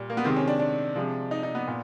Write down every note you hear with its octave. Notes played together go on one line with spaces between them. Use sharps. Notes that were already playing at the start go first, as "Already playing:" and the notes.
Already playing: A#2 G3
A#3
B3
C3 D#3 G#3 C4
C#4
D4
D4
C3 F3 G#3
D#4
D#4
B3
A#2